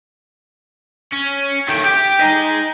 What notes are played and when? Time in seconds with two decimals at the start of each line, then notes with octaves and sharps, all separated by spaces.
1.12 C#4
1.68 D#3 A3 G5
1.85 G4 G5
2.21 D#4 D#5 G#5